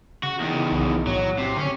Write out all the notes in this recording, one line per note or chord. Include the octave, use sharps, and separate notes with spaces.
C#3 F#4
E2 D#3
B1
A2 F#3
C3
D3 C#4